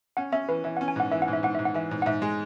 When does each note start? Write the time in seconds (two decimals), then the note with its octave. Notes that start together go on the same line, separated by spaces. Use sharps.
0.17 C#4 F#5
0.32 C#4 E5
0.49 E3 B4
0.64 E3 E5
0.77 F#5
0.81 C#4
0.88 G#5
0.96 G#2 F#5
1.12 E3 E5
1.22 F#5
1.28 G#2
1.33 E5
1.43 G#2 F#5
1.55 G#2 E5
1.65 F#5
1.74 E3 E5
1.91 G#2
2.02 F#5
2.06 G#2 E5
2.22 G#3